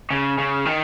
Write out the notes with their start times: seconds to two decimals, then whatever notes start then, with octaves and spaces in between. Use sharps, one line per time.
0.11 C#3
0.38 C#3
0.65 D#3